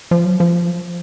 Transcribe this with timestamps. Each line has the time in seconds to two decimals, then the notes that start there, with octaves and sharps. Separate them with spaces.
0.11 F3
0.25 F#3
0.40 F3